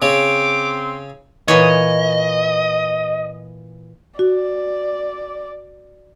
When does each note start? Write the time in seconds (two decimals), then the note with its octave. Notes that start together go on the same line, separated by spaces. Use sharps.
0.02 C#3 C4 C#5 D6
1.48 A#2 E3 C#5 D#5
4.19 F#4 D5